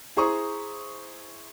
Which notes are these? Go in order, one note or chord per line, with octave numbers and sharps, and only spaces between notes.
E4 G#4 C5 A#5 C#6 D#6